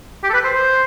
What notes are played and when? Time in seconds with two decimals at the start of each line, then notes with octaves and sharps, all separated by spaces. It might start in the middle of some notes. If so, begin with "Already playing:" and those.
0.23 G4
0.30 A4
0.34 B4
0.44 C5
0.54 C5